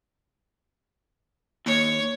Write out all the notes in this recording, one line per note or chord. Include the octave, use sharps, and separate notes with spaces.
D#2 C#5